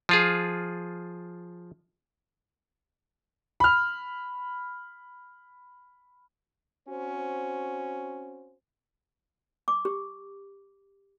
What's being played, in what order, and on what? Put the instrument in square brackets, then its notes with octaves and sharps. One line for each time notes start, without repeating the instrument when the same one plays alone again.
[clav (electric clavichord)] F3 F4 G#4
[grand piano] B5 F6
[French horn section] C4 C#4 F#4 C5
[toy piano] D6
G4